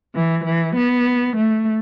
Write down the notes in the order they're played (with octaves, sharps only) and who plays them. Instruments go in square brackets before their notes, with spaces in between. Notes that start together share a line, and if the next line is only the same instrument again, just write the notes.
[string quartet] E3
E3
B3
A3